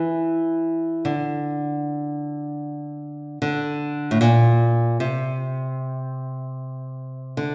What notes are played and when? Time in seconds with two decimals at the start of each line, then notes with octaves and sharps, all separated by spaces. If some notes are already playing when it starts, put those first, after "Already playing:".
Already playing: E3
1.05 D3
3.42 D3
4.11 A2
4.21 A#2
5.00 C3
7.37 D3